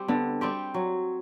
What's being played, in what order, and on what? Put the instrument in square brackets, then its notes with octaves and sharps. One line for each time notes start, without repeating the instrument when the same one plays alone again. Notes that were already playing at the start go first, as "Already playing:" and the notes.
Already playing: [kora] G3 C4 G4
[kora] D3 [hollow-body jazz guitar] B3
[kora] G3 C4 G4
F#3